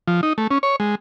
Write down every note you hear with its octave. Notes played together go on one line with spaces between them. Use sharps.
F3
D#4
A3
C#4
C#5
G#3